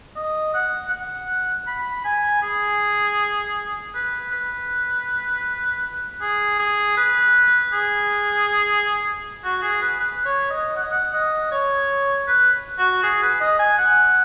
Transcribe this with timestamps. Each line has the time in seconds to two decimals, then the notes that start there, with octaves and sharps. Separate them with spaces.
0.16 D#5
0.54 F#5
0.91 F#5
1.67 B5
2.05 G#5
2.42 G#4
3.95 B4
4.32 B4
6.21 G#4
6.59 G#4
6.97 B4
7.73 G#4
9.44 F#4
9.62 G#4
9.82 B4
10.00 B4
10.25 C#5
10.50 D#5
10.76 F#5
10.83 D#5
10.91 F#5
11.14 D#5
11.52 C#5
12.28 B4
12.78 F#4
13.03 G#4
13.23 B4
13.41 D#5
13.59 G#5
13.78 F#5